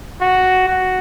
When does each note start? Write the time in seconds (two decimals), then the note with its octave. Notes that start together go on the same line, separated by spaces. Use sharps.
0.21 F#4
0.68 F#4